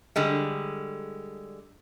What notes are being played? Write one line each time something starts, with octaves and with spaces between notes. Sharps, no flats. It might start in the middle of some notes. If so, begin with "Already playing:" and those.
D3 G3 G#3